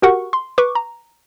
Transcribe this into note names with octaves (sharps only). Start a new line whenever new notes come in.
F#4 G4 A#4 F#5 C#6
C6
B4 C#6 D6
A#5